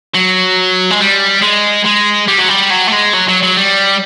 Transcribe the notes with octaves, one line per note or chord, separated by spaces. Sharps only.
F#3
G#3
G3
G#3
G#3
G3
F#3
G3
F#3
A3
G#3
F#3
F#3
F#3
G3